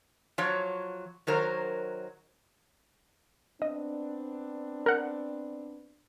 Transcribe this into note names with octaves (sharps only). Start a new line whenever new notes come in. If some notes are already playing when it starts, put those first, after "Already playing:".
F3 F#3 C#5
D#3 F#3 A#4 C5
B3 C4 D4 D#5
A#4 F#5